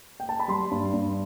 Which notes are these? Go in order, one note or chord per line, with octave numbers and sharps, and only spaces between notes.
G5
A5
B5
G3 C6
G2
G2